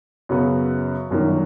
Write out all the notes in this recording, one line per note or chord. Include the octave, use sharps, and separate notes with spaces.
F#2 C#3 F#3 B3
G1 F#2 D#3